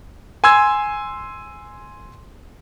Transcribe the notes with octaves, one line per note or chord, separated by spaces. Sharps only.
G#5 C6 E6 G#6